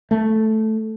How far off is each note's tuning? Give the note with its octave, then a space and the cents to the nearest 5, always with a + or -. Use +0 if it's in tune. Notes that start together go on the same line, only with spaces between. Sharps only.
A3 -5